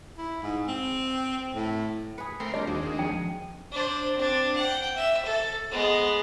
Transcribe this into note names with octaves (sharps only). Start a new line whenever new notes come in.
E4
G#2
C4
A2
G#4 B4 C#7
A3 C4 A#4 C6
G3 D4 F4 D#5
D#2 G#3 F#4
F3 G5 D#7
D4 C5
C4 D4
F#5 G5
E5
A4
G#3 B3